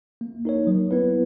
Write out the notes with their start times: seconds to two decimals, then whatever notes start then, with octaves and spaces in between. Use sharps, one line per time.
0.21 A#3
0.45 D#4 A#4 C#5
0.67 F#3
0.91 B3 E4 B4